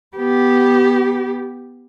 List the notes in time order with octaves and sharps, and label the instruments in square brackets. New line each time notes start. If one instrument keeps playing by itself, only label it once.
[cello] B3 G4